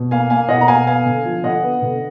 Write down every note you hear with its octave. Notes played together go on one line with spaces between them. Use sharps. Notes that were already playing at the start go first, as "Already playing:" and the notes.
Already playing: B2
A#3 F5 G#5
A#3 F5 G#5
B2 D#5 F#5
A#5
B2 F5 G#5
B3 F5 G#5
D3
F3
D3 D#5 F#5
B3
D3